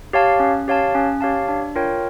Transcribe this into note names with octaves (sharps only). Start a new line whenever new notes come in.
G4 C#5 F5 A5
C#4
G4 C#5 F5 A5
C#4
G4 C#5 F5 A5
D4
F4 A#4 C#5 G5